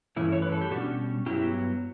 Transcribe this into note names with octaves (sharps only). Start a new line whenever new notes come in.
G2 E3 A3 C#4 E4
C#5
B4
A4
G4
B2 G3 C#4 D4 F#4
G2 F#3 B3 E4 G4